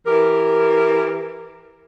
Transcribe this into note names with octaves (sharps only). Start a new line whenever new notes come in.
E3 G4 A#4